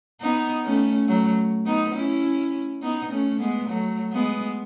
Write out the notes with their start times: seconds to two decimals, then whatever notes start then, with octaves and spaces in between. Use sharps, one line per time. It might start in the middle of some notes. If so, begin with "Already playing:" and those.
0.21 B3 D#4
0.65 A3 C#4
1.08 F#3 A3
1.66 B3 D#4
1.95 C#4 E4
2.83 B3 D#4
3.11 A3 C#4
3.40 G#3 B3
3.69 F#3 A3
4.13 G#3 B3